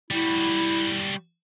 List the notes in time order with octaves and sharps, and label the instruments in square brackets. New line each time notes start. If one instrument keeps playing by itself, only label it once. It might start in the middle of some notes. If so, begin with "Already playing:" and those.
[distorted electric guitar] G3 F#4 [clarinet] E4